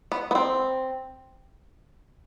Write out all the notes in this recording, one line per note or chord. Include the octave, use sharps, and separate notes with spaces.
B3
B3
C4